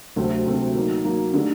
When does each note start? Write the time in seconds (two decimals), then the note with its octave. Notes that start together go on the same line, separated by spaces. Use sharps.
0.16 D2 C3 F#3 A3 C4
0.46 D2 C3 F#3 A3 C4
0.75 F#3 A#3 D#4
1.04 F#3 A#3 D#4
1.34 D3 A3 D#4 G4